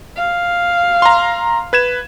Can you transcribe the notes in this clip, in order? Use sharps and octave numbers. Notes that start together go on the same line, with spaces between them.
F5
A#5 C6
B4 G#6 E7